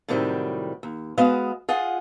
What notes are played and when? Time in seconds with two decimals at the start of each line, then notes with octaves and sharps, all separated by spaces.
0.09 A2 C3 D#3 F#3 G3
0.83 D#2
1.18 G#3 B3 F#4 D#5 F5
1.69 F4 G#4 D#5 F#5